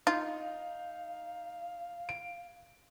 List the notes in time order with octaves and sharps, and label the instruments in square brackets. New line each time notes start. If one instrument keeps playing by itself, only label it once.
[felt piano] D#4 [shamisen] F4 [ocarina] F5
[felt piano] D7